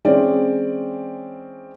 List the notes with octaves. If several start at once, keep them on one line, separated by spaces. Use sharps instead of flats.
E3 G#3 C4 C#4 D5